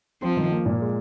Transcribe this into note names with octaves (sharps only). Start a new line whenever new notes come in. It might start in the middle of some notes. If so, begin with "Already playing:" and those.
F3 C4
D#3
A#3
A#2
G#3